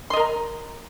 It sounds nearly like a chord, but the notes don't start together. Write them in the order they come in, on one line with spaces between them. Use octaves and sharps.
C6 D#5 A#4 A#5